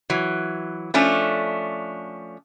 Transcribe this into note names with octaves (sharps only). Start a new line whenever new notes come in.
E3 F#3
F3 A3 C#4 D4